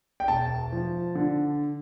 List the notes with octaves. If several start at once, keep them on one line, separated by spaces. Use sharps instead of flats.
G5
E1 A5
F3
D3